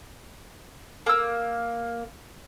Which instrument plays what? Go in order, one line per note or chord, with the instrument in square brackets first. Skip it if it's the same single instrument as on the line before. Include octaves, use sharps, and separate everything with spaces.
[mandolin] A#3 E6